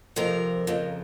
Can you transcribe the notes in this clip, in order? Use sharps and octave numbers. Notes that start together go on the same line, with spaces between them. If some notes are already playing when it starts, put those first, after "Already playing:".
F2 C3 F3 A#4
F2 C#3 F3